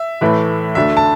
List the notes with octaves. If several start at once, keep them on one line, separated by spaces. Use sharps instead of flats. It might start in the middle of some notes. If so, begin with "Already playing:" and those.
Already playing: E5
A2 E3 A3 E4 B4
D2 D3 A3 D4 E5
A5